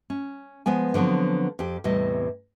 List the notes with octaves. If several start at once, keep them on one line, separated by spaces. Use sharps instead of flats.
C#4
F3 G#3 B3 G#5
D3 F3 F#3 B3 C4
F2 G4
E2 A2 C3 G3 D#5